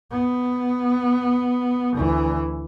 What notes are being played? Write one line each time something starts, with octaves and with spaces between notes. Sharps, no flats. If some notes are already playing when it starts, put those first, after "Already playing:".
B3
D2 E3